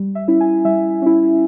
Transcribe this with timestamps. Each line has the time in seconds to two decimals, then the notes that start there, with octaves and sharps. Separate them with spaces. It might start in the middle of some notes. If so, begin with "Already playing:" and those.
Already playing: G3
0.15 E5
0.28 C#4 E4
0.41 G#5
0.65 G3 E5
1.02 C#4 E4